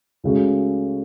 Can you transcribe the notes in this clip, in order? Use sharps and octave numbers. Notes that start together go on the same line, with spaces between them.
C#2 C#3 A3 F#4